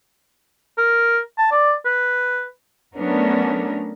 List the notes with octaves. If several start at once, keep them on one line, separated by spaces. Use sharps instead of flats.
A#4
A5
D5
B4
F#3 A3 B3 C#4 D4 A#4